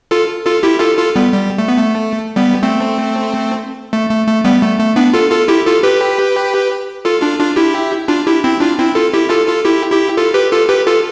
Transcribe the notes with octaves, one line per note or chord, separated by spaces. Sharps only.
F4 A4
F4 A4
E4 G4
F4 A4
F4 A4
G3 B3
G3
A3
B3
A3
G3 B3
A3 C4
A3
A3
A3
G3 B3
A3
A3
B3 D4
F4 A4
F4 A4
E4 G4
F4 A4
G4 B4
F4 A4
D4 F4
D4 F4
E4 G4
D4 F4
E4 G4
C4 E4
D4 F4
C4 E4
F4 A4
E4 G4
F4 A4
F4 A4
E4 G4
E4 G4
F4 A4
G4 B4
F4 A4
G4 B4
F4 A4